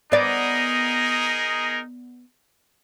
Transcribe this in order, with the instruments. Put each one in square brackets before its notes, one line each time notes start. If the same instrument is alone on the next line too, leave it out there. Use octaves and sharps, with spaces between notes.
[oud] B3 D5 [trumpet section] D#4 G#4 A#4